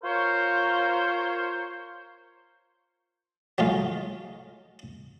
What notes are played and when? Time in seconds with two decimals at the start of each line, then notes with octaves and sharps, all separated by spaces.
0.04 F4 A#4 C5 C#5
3.58 F#3 G#3 A3 F4